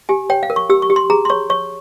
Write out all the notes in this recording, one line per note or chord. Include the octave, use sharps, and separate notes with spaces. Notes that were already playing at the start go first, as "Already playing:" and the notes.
G4 G#5
C#5 G5
F5
A#4
C#6
G4 E6
C#6
G4
C6
G#4 A#5
C6
C#5 C#6
C#5 C#6